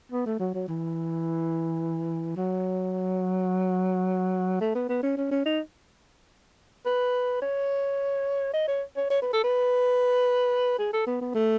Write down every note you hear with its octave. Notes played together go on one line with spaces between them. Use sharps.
B3
A3
F#3
F#3
E3
F#3
A3
B3
B3
C#4
C#4
C#4
D#4
B4
C#5
D#5
C#5
C#5
C#5
B4
A4
B4
G#4
A4
B3
B3
A3